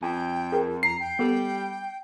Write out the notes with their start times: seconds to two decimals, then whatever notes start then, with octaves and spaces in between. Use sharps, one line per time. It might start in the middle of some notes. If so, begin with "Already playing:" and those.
0.03 F2 G5 G#5
0.52 G#4 A#4
0.83 A#5 C7
1.00 G5
1.19 G3 B3 A4